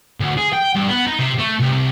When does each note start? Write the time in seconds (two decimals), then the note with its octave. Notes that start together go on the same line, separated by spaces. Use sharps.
0.20 D2
0.37 G#4
0.53 G5
0.75 G2
0.88 B3
1.07 D#4
1.19 C3
1.39 A3
1.60 C2